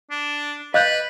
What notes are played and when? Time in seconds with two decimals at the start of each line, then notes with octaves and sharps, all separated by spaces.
0.11 D4
0.74 B4 D#5 F5 F#6 G6